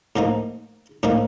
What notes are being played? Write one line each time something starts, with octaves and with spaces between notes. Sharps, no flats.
A2 F3 A#3 D#4
A2 F3 A#3 D#4